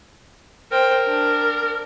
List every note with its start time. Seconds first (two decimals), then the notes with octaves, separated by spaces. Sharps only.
0.72 A#4 C5 G5
1.06 D4